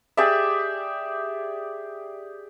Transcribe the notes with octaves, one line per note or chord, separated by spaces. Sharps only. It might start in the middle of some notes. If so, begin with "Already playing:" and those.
G4 G#4 D5 E5